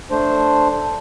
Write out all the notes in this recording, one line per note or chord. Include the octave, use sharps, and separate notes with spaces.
A3 D4 C5